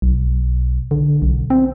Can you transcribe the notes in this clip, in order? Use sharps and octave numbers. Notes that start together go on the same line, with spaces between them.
B1
D3
B1
C4